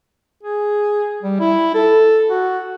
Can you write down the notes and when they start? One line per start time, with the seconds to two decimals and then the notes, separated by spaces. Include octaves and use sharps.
0.43 G#4
1.23 G3
1.40 E4
1.75 A4
2.30 F#4